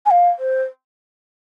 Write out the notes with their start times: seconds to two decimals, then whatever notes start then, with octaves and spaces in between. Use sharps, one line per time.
0.06 G#5
0.11 F5
0.39 C5